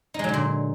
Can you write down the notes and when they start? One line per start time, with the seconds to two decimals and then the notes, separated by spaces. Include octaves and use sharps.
0.14 D#4
0.19 G#3
0.24 F#3
0.29 D3
0.34 A#2